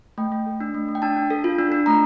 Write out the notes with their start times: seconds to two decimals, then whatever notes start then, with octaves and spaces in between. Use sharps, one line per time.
0.18 A3 G5
0.32 A3
0.46 A4
0.60 D4
0.74 A3
0.88 A3
0.95 G5
1.02 D4 A5
1.17 D4
1.30 A4
1.44 F4
1.59 D4
1.72 D4
1.86 A3 A#5